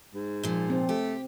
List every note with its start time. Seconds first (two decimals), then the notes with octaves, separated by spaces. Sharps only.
0.14 G#2
0.43 A#2 F3
0.70 C4
0.89 A3 G4